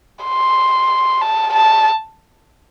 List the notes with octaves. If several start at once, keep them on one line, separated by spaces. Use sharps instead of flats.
C6
A5
A5